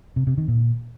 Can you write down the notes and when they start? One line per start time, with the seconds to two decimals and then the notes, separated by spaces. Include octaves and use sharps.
0.16 C3
0.27 C3
0.38 D#3
0.48 A#2